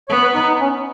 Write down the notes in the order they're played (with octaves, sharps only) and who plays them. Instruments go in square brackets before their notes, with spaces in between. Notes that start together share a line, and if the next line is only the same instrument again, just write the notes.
[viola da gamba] B3 [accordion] C#5
[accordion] B4
D#4
D#4
C#4